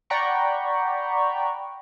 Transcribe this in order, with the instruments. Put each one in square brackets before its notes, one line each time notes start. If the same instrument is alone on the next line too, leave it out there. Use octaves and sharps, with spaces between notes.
[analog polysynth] D5 F#5 G5 A#5 B5 C#6